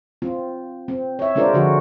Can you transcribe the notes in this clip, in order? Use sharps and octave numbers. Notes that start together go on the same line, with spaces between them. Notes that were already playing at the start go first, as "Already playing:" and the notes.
C4 F4
C4
C#5 E5
G#3 D4 F4 A#4 C5 D5
D3 F3 F#4